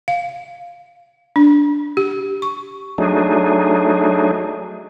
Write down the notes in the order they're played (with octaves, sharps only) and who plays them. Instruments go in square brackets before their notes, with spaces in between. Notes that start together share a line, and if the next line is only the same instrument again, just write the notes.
[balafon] F5
D4
G4
C#6
[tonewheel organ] F#3 A3 D4 D#4 G#4